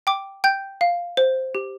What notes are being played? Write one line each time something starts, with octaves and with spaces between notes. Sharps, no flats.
G5 D6
G5 G6
F5
C5
G4